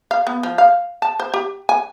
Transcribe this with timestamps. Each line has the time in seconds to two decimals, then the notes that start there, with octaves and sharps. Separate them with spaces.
0.11 F5
0.27 B3
0.43 F3
0.58 F5
1.02 A5
1.20 C5
1.34 G4
1.69 G#5